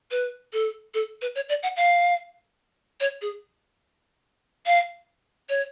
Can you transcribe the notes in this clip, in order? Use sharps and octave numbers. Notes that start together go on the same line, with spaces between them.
B4
A4
A4
B4
C#5
D5
F#5
F5
C#5
G#4
F5
C#5